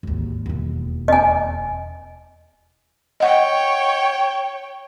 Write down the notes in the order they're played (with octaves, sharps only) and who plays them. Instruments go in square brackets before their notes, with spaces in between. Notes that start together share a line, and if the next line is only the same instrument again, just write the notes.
[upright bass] G#1 D#2
E1 D#2
[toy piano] D#5 G#5
[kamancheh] C#5 G5 [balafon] D#5 F#5